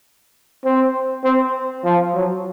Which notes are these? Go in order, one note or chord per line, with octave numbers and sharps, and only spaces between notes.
C4
C4
F3
F#3